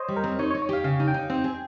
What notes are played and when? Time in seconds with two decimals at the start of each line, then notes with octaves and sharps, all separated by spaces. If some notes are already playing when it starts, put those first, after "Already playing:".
Already playing: C5 C#5 D#5
0.08 G3
0.16 A#4
0.24 C4
0.39 D#4 C#5
0.50 C#5
0.55 D#4
0.62 C#5
0.69 G4 F5
0.84 C#3 F5
1.00 D#4
1.08 G5
1.14 D#4
1.30 C4 G5
1.44 G#4